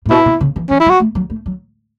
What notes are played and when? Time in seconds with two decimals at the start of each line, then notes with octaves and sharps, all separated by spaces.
0.06 A2
0.10 B2 E4
0.26 B2
0.41 C#3
0.56 E3
0.70 E3 C#4
0.80 E4
0.86 F#3
0.90 F#4
1.00 A3
1.15 F#3
1.30 A3
1.46 F#3